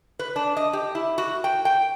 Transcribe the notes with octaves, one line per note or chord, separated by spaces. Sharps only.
B4
D4
D#5
G4
E4
F#4
G5
G5